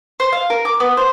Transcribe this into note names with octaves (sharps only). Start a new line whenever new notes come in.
C5
F5
A#4
D6
B3
C5